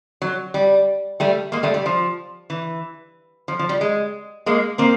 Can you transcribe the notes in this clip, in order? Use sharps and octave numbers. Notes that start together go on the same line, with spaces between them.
F#3
G3
G3 A3
G#3 A#3
G3 A3
G3
F3
E3
F3
F3
G3
G#3
G#3 A#3
A#3 C4